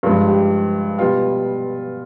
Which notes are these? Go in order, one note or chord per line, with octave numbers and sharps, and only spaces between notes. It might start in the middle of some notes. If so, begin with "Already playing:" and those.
G2 F3 G#3 F4
G4
B2 G3 F4